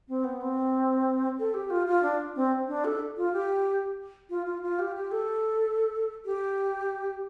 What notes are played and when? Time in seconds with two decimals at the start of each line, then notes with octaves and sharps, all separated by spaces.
0.08 C4
0.24 B3
0.41 C4
1.39 A4
1.54 G4
1.70 F4
1.87 F4
2.03 D4
2.36 C4
2.68 D4
2.85 A4
3.17 F4
3.33 G4
4.30 F4
4.46 F4
4.63 F4
4.79 G4
4.96 G4
5.12 A4
6.25 G4